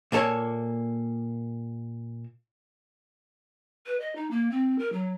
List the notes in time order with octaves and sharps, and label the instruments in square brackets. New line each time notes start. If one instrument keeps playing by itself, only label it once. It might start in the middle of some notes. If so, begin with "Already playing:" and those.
[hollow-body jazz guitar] A#2 A#3 A4 C#5
[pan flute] B4
D#5
D#4
A#3
C4
A#4
F#3